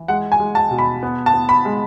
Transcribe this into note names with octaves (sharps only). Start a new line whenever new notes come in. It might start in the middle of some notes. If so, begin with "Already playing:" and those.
Already playing: E3
G#3 F#5
G#5
G#3
A5
B2
B5
B3
A5
B3
B5
G#3